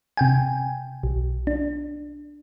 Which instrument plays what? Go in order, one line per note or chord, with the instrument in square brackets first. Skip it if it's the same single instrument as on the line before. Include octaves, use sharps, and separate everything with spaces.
[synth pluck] C3 G5 G#5
B1
D4